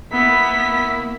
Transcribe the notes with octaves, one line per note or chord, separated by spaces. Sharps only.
A#3 B3 E4 B6